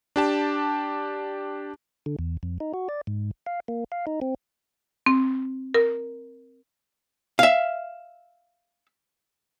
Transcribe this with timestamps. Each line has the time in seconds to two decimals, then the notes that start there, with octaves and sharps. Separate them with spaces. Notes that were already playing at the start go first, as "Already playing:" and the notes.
0.16 D4 G4 A5
2.06 D3
2.19 E2
2.43 F2
2.60 D#4
2.74 F#4
2.89 D5
3.07 G#2
3.46 F5
3.68 A#3
3.92 F5
4.07 D#4
4.21 C4
5.06 C4
5.74 A#4
7.39 E5 F5